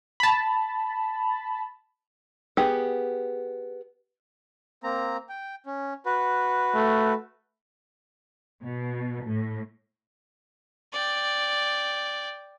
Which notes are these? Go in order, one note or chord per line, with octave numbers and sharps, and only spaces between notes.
A5 B5
B3 G4 G#4 F#5
A#3 C4 A#5
G5
C#4
F#4 B4
A3
B2
A2
D5 G5